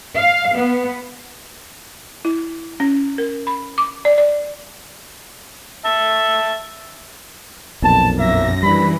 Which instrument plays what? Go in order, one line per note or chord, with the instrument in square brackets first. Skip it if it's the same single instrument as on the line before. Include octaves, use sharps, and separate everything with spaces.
[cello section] F5
B3
[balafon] E4
C#4
A#4
B5
D6
D5
D5
[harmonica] E5 A5
[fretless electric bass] B1 F2 A#2 [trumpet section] A5
[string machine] F#2 A#6 [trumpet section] A#3 E5
[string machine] E3 [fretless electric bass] G3 D4 [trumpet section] B5